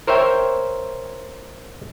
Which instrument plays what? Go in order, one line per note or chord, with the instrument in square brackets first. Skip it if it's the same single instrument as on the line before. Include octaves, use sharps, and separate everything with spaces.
[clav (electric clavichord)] A#4 C5 C#5 E5 G5